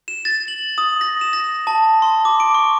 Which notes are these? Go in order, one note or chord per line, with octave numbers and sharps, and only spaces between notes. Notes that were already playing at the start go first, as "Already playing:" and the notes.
E7
A6
F#7
D#6
A#6
E7
A#6
A5
C6
D6
D7
C#6